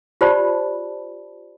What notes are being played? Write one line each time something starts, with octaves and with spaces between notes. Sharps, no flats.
F4 G4 C5 D5 A5 B5